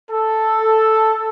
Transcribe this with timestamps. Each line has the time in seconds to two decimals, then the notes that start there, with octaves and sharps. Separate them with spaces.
0.11 A4